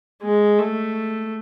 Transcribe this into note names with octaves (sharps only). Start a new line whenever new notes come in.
G#3
A3